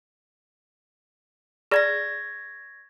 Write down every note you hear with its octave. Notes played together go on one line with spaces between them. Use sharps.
G#4 D5 C#6 G#6 A#6